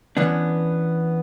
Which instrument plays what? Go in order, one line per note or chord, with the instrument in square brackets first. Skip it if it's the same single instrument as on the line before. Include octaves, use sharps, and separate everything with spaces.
[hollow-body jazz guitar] E3 B3 C#4 D4